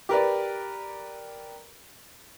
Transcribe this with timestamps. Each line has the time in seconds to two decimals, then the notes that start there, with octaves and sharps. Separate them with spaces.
0.09 G4 A#4 B4 D5